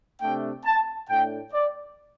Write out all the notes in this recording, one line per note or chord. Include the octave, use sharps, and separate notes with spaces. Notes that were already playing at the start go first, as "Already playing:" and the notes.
C3 A3 D4 G5
A5
A2 A3 D4 G5
D5